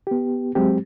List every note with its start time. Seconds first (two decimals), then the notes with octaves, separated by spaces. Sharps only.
0.07 B3 G4
0.55 F#3 G#3 C4 G4